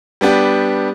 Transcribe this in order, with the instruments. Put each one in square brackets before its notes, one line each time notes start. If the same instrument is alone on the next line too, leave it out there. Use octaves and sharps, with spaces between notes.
[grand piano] G3 B3 D4 G4